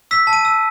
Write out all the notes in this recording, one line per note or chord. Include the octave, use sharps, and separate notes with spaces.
E6 B6
A5
D#7
E6